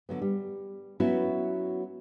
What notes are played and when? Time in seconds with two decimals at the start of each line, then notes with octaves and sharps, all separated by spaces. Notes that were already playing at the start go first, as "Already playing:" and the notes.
0.09 D3 F#3 B3
0.22 G3
1.00 F#3 B3 C#4 E4 F#4